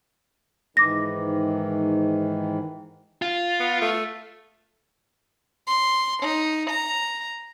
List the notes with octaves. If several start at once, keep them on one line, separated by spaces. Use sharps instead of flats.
G#2 D#3 E3 D6 A#6
F4
B3
A3
C6
D#4
A#5